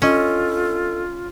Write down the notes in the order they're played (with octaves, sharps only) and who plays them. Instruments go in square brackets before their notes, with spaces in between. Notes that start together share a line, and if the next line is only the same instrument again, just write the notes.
[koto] C#4 [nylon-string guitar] D4 D#5 [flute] F4 [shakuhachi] A4